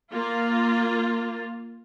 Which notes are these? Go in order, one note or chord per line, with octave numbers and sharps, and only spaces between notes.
A#3 F4